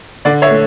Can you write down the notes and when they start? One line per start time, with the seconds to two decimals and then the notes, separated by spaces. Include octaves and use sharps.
0.25 D3 D5
0.42 C#5 E5
0.50 A3